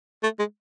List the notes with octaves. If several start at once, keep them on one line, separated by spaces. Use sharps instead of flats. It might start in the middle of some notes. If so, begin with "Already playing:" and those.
A3
G#3